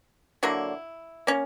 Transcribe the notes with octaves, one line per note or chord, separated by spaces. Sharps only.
D3 F#3 A#3 E4
A#3 C#4